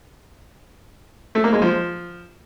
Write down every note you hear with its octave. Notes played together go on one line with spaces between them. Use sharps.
A3
A#3
G#3
F3